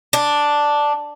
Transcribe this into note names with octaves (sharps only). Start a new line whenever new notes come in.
D4